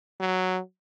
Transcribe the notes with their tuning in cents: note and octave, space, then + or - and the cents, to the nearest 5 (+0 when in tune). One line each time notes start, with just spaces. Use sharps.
F#3 +0